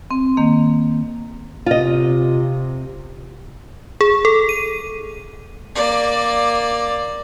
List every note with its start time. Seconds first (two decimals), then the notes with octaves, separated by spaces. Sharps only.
0.11 C4
0.37 D#3 A#3
1.66 C3 F4 D#5
4.01 G#4
4.25 A4
4.49 D#7
5.75 A#3 D5